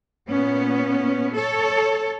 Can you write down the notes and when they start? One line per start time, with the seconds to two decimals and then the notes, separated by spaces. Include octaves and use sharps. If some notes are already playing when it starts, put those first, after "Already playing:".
0.29 A#2 B3 C#4
1.35 A4 C#5